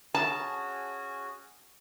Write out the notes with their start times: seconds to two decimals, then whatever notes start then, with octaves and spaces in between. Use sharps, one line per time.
0.14 C#4 F#4 G#4 A5